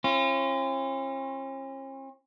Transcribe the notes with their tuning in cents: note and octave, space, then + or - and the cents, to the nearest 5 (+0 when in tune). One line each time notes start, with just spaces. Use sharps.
C#4 -45 F4 -40